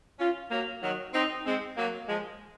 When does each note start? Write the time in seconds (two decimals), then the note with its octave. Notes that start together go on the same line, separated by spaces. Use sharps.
0.20 C#4 F4
0.51 F#3 A#3
0.82 D#3 F#3
1.14 C4 D#4
1.46 G#3 C4
1.77 F#3 A#3
2.09 F3 G#3